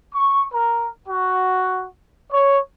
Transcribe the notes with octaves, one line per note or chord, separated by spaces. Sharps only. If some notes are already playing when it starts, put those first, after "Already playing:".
C#6
A#4
F#4
C#5